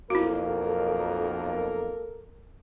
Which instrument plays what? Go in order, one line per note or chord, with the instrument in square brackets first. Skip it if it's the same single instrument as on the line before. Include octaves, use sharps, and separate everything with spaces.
[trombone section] B1 F2 [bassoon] A#3 [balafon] E4 F#4 [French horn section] A4 A#4